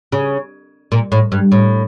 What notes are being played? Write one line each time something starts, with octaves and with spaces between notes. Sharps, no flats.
C#3
A#2
A2
G2
A2